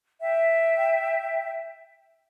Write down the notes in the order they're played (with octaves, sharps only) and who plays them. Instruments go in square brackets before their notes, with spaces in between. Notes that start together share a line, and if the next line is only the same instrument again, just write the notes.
[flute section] E5 G5